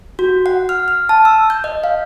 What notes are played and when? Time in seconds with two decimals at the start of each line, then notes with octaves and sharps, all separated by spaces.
0.19 F#4
0.46 F#5
0.69 F6
0.88 F6
1.09 A5
1.25 E6
1.50 G6
1.64 D#5
1.84 F5